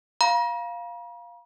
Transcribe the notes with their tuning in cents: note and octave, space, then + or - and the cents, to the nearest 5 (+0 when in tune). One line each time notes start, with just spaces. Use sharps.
F5 +0 A#5 +45